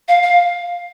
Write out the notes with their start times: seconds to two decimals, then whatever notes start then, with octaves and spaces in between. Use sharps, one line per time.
0.08 F5
0.23 F5